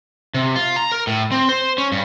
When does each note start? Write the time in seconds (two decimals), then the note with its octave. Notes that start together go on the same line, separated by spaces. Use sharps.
0.34 C3
0.56 F4
0.76 A#5
0.92 A#4
1.07 A2
1.32 C4
1.49 C5
1.78 C#4
1.92 G2